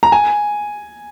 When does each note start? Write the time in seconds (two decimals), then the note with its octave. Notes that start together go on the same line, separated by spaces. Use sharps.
0.03 A#5
0.12 G#5